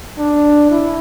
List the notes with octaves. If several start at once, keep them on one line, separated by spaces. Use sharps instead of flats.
D4
E4